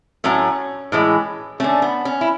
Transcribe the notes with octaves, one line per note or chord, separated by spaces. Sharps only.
A2 F#3 A3 C#4
A2 E3 G#3
D3 A3 C#4
B3
C#4
E4